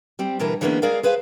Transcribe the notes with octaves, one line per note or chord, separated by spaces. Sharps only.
G3 C4
B2 D3 E3 A#4 B4
D3 E3 G#3 A#3 B3 C#4
G#3 G#4 A#4 D5 F5
G#4 B4 C5 F5